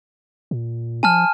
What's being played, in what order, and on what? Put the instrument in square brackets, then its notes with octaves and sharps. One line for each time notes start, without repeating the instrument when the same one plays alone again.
[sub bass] A#2
[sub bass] F3 [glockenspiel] G#5 A5 F6